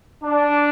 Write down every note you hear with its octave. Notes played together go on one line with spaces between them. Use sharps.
D4